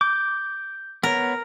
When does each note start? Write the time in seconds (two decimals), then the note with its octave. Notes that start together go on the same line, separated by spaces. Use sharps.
0.01 D6 G6
1.03 B3 A#4 C#5